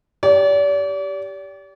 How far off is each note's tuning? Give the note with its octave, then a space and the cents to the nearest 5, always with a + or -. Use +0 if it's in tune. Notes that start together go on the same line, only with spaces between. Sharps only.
G4 +0 D5 -40